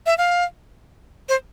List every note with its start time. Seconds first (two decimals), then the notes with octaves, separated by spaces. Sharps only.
0.06 E5
0.18 F5
1.29 C5